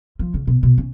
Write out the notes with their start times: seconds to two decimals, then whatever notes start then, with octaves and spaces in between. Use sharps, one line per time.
0.19 F3
0.34 C#3
0.47 B2
0.63 B2
0.78 C#4